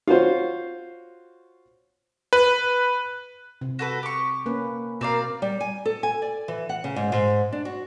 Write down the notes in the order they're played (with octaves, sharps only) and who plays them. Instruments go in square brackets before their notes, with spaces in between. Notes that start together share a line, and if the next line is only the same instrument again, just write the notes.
[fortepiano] F4 F#4 C5 C#5
[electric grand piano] B4
[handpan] C3
[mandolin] F#4 A4 B4
G4 C#6
[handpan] A#3 C#4 B4
[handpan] B2 [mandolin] C4 D5 F5 [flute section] A#4 A#5
[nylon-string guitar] G3
G#5
A4
G#5
D5
E3
F#5
C#3
G#2
G#2
D4
F#4